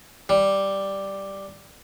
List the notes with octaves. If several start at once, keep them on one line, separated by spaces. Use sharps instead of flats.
G3